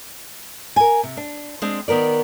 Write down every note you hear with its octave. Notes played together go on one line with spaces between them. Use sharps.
A#4 G#5
C3
D4
G#3 C4 D4
D#3 B3 A#4 D5